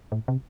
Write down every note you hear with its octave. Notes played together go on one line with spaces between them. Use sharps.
A2
C3